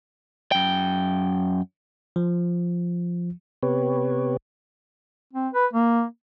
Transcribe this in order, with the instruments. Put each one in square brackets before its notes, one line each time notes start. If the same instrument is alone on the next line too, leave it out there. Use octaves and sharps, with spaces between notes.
[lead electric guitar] F#2 G5
[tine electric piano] F3
[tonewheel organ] C3 B3 G4 B4 C#5
[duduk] C4
B4
A#3